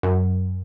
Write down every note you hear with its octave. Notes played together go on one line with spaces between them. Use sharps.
F#2